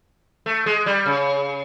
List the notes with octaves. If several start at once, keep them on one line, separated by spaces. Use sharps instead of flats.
A3
G#3
G3
C#3